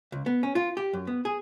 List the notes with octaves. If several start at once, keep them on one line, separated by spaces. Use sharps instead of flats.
C#2
B3
C#4
F4
G4
F#2
B3
G#4